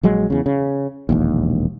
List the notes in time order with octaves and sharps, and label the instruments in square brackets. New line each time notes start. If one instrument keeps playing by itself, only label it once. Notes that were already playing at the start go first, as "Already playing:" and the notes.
[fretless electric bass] A#1 F#3 G#3
E2 C#3
C#3
E1 A#1 D#2